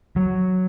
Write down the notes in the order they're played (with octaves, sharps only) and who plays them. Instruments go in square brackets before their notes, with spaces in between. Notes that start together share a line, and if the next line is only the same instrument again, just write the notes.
[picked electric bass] F#3